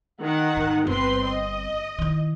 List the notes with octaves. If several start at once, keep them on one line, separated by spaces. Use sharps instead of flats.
D#3 F#5
G#2
G1 C4 B4 C6
D#5
D#3 E4